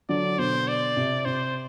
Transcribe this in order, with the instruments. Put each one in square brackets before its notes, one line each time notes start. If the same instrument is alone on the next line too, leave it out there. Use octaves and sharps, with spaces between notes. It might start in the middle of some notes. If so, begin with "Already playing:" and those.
[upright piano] D3 F#3 [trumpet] D5
[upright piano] B2 D3 [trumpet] C5
[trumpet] D5
[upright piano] C3
[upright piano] C3 [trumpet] C5